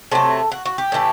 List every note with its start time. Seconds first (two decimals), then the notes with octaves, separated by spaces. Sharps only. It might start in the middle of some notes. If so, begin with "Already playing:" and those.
0.11 C3 F#3 A3 A4
0.52 F#4
0.66 F#4
0.78 G4
0.92 A2 E3 A3